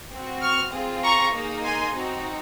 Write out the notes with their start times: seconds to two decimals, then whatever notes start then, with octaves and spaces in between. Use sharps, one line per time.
0.12 C4 F#4
0.43 C#6 F6
0.73 C4 F4 G#4
1.04 A#5 C#6
1.34 A#3 D#4 G#4
1.65 G#5 C6
1.96 C4 D#4 F#4